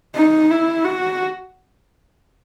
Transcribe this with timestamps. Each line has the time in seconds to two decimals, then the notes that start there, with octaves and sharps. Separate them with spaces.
0.15 D#4
0.51 E4
0.85 F#4